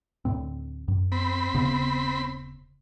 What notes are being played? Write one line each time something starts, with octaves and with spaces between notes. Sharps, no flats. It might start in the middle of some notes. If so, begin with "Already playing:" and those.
D2 A2 C4
F#2
C4 B5
D#1 C#3 B3